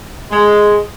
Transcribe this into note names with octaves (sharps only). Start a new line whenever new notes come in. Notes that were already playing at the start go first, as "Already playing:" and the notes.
G#3